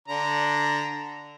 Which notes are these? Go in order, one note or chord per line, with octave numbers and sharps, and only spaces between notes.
D3 D4 A#5